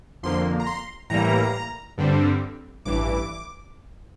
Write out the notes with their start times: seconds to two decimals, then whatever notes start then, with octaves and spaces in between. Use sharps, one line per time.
0.23 F2 D3 F3 A#3 C6
0.60 A#5
0.66 C6
1.10 A2 E3 G3 A#3 A#5
1.98 G2 D3 G3 C4
2.85 A1 G2 E3 D6